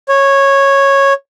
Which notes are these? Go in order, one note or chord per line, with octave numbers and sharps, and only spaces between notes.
C#5